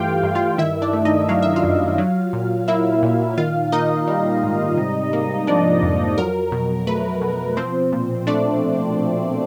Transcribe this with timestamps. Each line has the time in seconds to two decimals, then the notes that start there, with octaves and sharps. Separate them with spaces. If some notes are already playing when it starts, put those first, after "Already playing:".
Already playing: G2 E3 A3 F4 G4 F5 G5
0.23 G2
0.35 F4 F5
0.58 D#3 E4 E5
0.82 D4 D5
0.93 A3
1.05 D#4 D#5
1.29 F#3 F5
1.42 E5
1.56 F4 F5
1.64 F#2
1.98 F#3
2.33 A#2
2.68 A#3 E4 E5
3.03 A#2
3.38 D#3 F4 F5
3.72 A#3 D#4 D#5
4.07 G3
4.43 G#2
4.77 C3
5.13 A#3
5.47 F3 D4 D5
5.83 F2
6.18 F#3 A#4
6.52 B2
6.87 A3 B4
7.22 B2
7.57 F3 C4 C5
7.92 A#2
8.27 A3 D4 D5